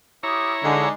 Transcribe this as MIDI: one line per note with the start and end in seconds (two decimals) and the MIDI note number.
0.23 0.89 64
0.23 0.52 67
0.23 0.89 73
0.23 0.89 82
0.23 0.52 87
0.64 0.85 50
0.64 0.93 56
0.64 0.89 62
0.64 0.93 63
0.64 0.89 74